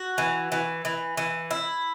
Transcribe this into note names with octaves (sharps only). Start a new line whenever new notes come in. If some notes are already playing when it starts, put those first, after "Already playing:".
Already playing: F#4
E3
E3
E3
E3
E4